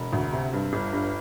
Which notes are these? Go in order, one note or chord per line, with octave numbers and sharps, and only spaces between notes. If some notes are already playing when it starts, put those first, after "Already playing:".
Already playing: E1
D2
C3
G2
G1
G2